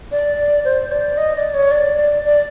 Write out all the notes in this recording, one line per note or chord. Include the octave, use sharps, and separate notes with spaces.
D5
C5
D5
D#5
D5
C#5
D5
D5